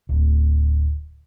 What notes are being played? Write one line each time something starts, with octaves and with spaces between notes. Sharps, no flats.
D1